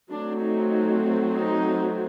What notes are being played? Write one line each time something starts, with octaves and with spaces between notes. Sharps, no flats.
F#3 A3 C4 D4
D#4
D#4